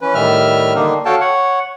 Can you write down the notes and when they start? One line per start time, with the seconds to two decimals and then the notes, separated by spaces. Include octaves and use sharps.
0.01 E3 C#4 B4
0.14 A2 D#3 G3 E5 F6
0.75 D3 D#3 A#3 D4 D#4
1.05 F#4 A4 C#5 F5 G5 A5
1.20 C#5 F#5